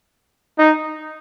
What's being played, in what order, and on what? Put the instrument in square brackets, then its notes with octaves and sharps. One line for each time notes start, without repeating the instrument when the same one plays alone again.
[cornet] D#4